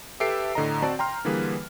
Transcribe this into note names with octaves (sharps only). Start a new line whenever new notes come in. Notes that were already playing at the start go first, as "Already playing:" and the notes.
G4 A4 B4 E5 C7 D7
A2 D3 D#5 A#5
C4 F#4 C5 D5 A5
G5 A#5 C6 F6
D3 E3 G3 A#3 G#4 B4